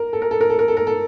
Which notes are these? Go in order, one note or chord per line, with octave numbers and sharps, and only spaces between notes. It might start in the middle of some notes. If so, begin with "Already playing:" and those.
Already playing: A#4
A4
A#4
A4
A#4
A4
A#4
A4
A#4
A4